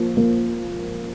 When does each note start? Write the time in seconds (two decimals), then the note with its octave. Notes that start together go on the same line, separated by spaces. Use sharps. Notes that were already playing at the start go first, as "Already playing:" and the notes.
Already playing: F3 A#3
0.17 A#3